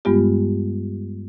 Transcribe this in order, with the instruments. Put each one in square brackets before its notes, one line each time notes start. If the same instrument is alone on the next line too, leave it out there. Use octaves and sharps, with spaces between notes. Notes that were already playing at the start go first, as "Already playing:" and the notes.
[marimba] G2 G3 G#3 B3 F4 G4